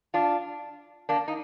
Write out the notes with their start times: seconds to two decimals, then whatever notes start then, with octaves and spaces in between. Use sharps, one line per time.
0.14 D4 F4
1.09 A#3 D4
1.28 D#4